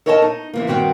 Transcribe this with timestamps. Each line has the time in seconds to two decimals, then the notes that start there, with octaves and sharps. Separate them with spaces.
0.06 A4 A#4 C#5 D#5 G#5 A5
0.22 D#4
0.54 C3 E3 A#3
0.67 G2 D#3 C4 F#4 F#5 G5